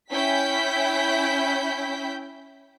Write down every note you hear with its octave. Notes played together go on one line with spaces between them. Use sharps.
C#4 E4 G5 G6 B6